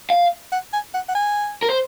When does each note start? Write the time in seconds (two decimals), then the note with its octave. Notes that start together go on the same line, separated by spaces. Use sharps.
0.10 F5
0.52 F#5
0.73 G#5
0.94 F#5
1.08 F#5
1.15 G#5
1.62 A#4
1.70 C5